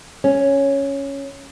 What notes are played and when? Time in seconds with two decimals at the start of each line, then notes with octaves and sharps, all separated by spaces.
0.24 C#4